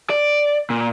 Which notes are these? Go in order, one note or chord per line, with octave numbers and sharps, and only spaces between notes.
D5
A#2